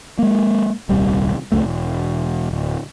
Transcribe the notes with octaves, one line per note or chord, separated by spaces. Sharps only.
G#3 A#3
D#1 C2 G3
C#2 F#2 A3
E1
D1